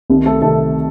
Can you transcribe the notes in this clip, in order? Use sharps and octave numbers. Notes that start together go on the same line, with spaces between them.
C2 C3 D#3
A3 A4
C2 C3 D#3 A3 A4